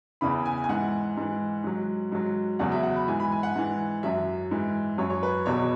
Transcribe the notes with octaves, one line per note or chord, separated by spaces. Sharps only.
E2 C#3 E3 B5
G#5
G#5
G#2 E3 F#5
G#2 E3
G#2 F#3
G#2 F#3
E2 C#3 F#3 F#5
E5
F#5
B5
G#2 E3 G#5
B5
G#5
F#5
G#2 E3
F#2 F#3 E5
G#2 E3
F#2 F#3 C#5
C#5
B4
E2 B2 F#3 C#5